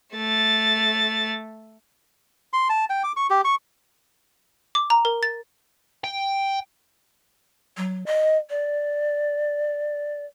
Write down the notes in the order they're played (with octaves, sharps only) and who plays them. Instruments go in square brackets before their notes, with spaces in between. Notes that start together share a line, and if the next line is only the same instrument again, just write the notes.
[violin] A3 A6
[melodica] C6
A5
G5
D6
C#6
G4
C#6
[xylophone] D6
A#5
A#4
A6
[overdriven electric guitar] G5
[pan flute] F#3
D#5
D5